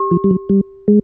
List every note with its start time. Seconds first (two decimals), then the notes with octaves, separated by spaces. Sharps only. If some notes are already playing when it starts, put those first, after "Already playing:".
Already playing: G4
0.11 F3
0.24 G3
0.31 F#3
0.49 G3
0.88 G#3